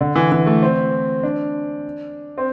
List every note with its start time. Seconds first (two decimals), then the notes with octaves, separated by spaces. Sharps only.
0.01 D3
0.15 E3
0.32 E3
0.46 A3
0.62 C4
1.23 D4
2.38 C4